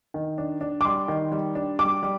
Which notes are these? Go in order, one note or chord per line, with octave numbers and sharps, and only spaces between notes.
D#3
D4
D4
D6
G3 C6
D#3
G3
D4
G3 D6
G3